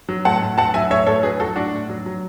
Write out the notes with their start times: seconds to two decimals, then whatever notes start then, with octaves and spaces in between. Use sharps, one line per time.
0.09 F#3
0.25 A2 F#5 A5
0.42 A2
0.57 F#3 F#5 A5
0.74 F#3 E5 G#5
0.90 A2 C#5 E5
1.07 A2 A4 C#5
1.23 F#3 G#4 B4
1.40 F#3 F#4 A4
1.56 A2 D4 F#4
1.73 A2
1.89 F#3
2.06 F#3